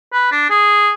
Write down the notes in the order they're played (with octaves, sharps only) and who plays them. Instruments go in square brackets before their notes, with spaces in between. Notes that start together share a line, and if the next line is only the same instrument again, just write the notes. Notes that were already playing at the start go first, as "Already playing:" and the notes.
[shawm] B4
D4
G#4